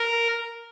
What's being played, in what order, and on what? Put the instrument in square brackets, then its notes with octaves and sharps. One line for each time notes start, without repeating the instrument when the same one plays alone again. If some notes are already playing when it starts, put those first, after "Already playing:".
Already playing: [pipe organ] A#4